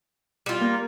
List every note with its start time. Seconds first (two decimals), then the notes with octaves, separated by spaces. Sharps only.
0.46 G3 F4
0.61 A#3